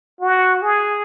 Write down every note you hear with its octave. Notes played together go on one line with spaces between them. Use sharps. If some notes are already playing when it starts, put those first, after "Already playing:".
F#4
G#4